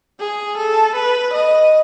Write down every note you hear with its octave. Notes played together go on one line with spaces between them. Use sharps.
G#4
A4
B4
D#5